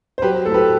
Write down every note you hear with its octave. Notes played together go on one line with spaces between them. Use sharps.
C5
F#3 G4 B4
A2 A4
G4 B4